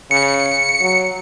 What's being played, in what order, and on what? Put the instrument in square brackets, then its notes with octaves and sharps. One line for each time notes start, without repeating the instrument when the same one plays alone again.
[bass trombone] C#3 [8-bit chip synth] C#7
[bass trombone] F#3